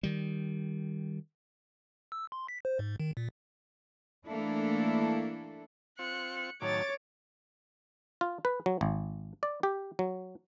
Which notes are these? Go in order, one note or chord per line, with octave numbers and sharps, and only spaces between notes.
D#3 G3
E6
C6
B6
C5
G#2
D#3
A#2
E3 A3 A#3 D4 E4 A4
C4 F4 F#6 C#7
A2 D#3 F#3 C#5 D6 A6
F4
B4
F#3
G#1
D5
G4
F#3